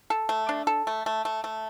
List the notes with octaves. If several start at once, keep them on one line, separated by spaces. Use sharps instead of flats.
A4
A3
D4
A4
A3
A3
A3
A3